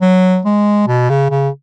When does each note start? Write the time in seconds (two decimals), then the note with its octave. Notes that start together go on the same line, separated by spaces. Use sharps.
0.01 F#3
0.45 G#3
0.88 B2
1.10 C#3
1.30 C#3